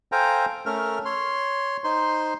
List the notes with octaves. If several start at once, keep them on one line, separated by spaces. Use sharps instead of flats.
A4 C5 F5 G5 G#5 A#5
A3 C#4 A#4 E5 F6
C#5 C6
D#4 C5 C6